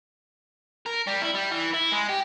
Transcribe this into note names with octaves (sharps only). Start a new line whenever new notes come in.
A#4
G3
E4
G3
E3
E4
G#3
G4